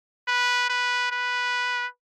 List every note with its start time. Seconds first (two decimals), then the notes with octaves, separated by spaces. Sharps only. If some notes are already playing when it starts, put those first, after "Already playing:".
0.28 B4
0.69 B4
1.11 B4